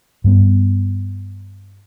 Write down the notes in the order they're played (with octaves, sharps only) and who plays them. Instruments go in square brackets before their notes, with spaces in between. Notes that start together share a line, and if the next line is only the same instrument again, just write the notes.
[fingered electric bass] G2 G3 B3